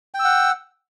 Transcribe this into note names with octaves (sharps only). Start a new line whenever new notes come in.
F#5 G5 E6